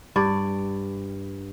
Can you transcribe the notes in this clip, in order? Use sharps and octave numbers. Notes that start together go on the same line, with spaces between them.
G2 D5